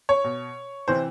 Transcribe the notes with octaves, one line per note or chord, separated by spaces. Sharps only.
C#5
B2
C3 E3 C5